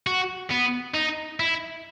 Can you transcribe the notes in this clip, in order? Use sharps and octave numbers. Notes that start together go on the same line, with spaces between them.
F#4
B3
D#4
E4